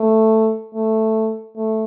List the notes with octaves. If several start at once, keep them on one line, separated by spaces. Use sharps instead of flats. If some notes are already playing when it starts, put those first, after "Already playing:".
Already playing: A3
A3
A3